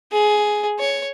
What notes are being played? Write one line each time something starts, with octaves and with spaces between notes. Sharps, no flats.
G#4
C#5